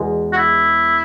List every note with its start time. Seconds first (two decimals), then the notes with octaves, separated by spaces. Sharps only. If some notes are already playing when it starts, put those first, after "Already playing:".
Already playing: E2 B2 G#3
0.33 F#4
0.37 E4